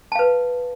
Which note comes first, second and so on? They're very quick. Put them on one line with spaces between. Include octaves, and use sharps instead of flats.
A5 F5 B4